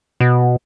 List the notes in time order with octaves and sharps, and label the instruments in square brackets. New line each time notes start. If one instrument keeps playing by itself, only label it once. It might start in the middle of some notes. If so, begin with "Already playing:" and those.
[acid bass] B2